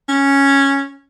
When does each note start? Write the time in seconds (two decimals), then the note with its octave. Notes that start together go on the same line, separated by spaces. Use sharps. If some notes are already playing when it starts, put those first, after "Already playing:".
0.09 C#4